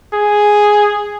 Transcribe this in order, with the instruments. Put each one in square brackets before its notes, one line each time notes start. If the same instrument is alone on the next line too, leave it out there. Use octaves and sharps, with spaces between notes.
[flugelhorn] G#4